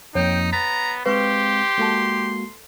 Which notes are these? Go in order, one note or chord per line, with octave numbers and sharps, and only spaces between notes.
F2 F3 A#3 D#4 C#5 G5
B3 A#5 A6 B6
G#3 C4 G4 B4 F5 C6 C#6
G#3 A#3 F#4 A4 A5